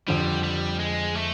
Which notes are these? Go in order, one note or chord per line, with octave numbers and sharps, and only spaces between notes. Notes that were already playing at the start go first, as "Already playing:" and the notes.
F2 D3 F3 G3
G3
G#3
A3